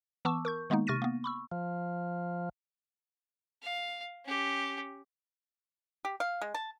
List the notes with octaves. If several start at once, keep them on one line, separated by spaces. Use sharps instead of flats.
E3 B3 A5 C#6 D6 E6
A#4 C#6 G6
D#3 G#3 A#3 B3 D#4
C3 C#6 F6 A6 A#6 D#7
A#3 B3
B5 C#6 E6
F3
F5
C#4 G4
G4
F5
G#3
A5